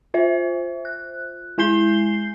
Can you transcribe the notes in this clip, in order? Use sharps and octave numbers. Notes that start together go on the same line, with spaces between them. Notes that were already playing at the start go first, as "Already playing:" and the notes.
F4 C5 E5
F#6
G#3 E4 G#5 G6 C7 G7